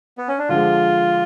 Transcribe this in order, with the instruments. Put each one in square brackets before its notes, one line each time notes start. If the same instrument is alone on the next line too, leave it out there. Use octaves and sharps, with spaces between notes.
[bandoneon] B3
C#4
D4
[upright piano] D3 F3 G#3 [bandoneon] F4